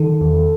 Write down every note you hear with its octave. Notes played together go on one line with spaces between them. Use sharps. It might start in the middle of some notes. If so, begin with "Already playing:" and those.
Already playing: D#3 A4
E2